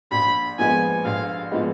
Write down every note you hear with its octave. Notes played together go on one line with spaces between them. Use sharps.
A#1 B5
A#2 F3 G#3 B3 G#5
A#1 F5
A#2 F3 G#3 B3